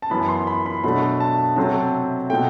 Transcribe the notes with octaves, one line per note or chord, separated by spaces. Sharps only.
A5
F#2 E3 B3 B5
C6
B5
B5
B2 F#3 A3 D4 B5
A5
C3 F#3 A3 C4 A5
B2 A3 G5